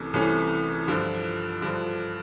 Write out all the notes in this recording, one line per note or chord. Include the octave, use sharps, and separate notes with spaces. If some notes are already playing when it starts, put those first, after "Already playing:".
Already playing: C2 C3 E3 A3 C#4
C2 C3 E3 A3 C#4
G2 D3 F3
G2 D3 F3